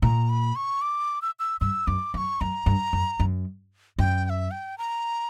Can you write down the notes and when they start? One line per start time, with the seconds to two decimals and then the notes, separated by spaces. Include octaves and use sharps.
0.02 A#2 A#5
0.29 B5
0.56 C#6
0.82 D6
1.22 E6
1.39 E6
1.61 G2 E6
1.87 F#2 D6
2.14 F#2 D6
2.17 C#6
2.41 F#2 A#5
2.66 G2
2.93 F#2
3.20 F#2
3.98 F#2 G5
4.25 G5
4.30 E5
4.51 G5
4.78 A#5